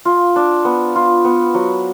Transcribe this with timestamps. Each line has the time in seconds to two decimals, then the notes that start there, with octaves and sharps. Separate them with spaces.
0.05 F4
0.36 D4
0.65 B3
0.96 F4
1.25 B3
1.54 F#3